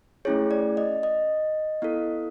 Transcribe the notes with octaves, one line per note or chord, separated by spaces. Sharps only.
A3 C#4 E4 G#4 C#5
D5
D#5
D#5
B3 E4 A4